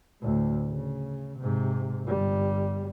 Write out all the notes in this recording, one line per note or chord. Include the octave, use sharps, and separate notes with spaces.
D2 A2
C#3
G#2 C3
G1 G3